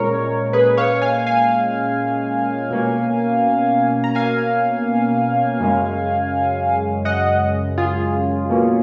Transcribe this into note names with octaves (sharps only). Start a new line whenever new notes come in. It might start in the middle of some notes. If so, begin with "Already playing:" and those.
Already playing: A#2 G#3 C#4 A#4 C#5
G#4 B4
C#5 F5
F5 G#5
F5 G#5
B2 A#3 C#4
A#5
F5 G#5
F#2 C#3 G#3 C#4
D#5 F#5
F4 G#4
B2 A#3 C#4